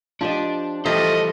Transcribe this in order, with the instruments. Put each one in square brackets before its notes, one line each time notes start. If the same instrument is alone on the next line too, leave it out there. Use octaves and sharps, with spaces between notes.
[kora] F3 G4 D#5 [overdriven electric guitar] D4
[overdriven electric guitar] E3 C5 [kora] F3 F4 G4 [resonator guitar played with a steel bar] A3 [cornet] D#5